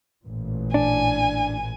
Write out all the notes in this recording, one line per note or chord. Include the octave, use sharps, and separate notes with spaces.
A1 A#2
D4 G#5